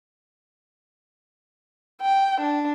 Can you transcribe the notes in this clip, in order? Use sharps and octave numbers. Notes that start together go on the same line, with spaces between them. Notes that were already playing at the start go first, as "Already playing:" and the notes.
G5
D4